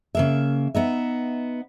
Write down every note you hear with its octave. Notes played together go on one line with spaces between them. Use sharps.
C#3 A#3 E5
B3 D#4 E5